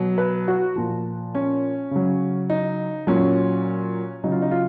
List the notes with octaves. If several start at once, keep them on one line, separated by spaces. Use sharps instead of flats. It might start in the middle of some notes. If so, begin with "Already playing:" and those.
Already playing: B2 F#3
B4
F#4
A#2 F3
C#4
C#3 F#3
D#4
A#2 F#3 C#4
C#3 F#3 D#4
F4
D#4
F4